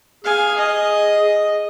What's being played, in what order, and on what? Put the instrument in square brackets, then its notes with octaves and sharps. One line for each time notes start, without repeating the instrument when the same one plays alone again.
[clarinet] G#4 [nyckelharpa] F5 G#5
[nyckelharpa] D#5